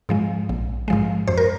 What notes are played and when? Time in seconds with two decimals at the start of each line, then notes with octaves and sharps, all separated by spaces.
0.09 G#2 F3 G#3
0.49 A#1
0.88 G#2 F3 G#3
1.27 F#2 C5
1.37 A#4